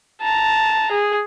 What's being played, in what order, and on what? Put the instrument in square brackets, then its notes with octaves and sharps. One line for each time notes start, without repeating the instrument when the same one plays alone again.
[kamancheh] A5 A#5
G#4